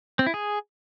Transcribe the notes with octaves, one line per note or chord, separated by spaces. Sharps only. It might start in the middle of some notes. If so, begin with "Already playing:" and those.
C4
E4
G#4